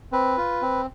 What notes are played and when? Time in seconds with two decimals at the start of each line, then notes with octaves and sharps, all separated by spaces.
0.12 C4 B4
0.37 F4
0.62 C4